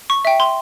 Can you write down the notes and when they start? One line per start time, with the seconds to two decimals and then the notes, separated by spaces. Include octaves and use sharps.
0.10 C#6
0.25 E5 G5
0.40 C6